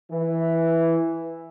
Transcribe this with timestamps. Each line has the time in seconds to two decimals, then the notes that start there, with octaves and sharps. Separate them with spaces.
0.11 E3